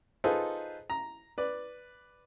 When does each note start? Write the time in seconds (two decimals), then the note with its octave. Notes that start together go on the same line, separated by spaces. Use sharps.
0.24 D#4 F4 G#4 A4 B4 C5
0.90 A#5
1.38 B4 D5